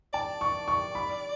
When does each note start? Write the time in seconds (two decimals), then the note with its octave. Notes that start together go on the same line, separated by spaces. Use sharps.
0.14 D5 A5
0.41 C#6
0.68 C#6
0.95 B5